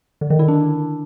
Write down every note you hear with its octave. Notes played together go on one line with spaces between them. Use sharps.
D3
D#3
E4
D4